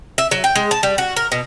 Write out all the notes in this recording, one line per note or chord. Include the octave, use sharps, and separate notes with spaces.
E5
F#3
G5
G#3
A5
G3
F#4
A#4
B2